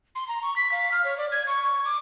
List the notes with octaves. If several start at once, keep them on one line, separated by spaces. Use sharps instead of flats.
C6
A#5
C#6
B6
F5
F6
C#5
D5
G#6
C#6
C#6
D6